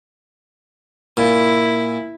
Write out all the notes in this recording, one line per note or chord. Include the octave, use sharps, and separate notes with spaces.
A#2 E4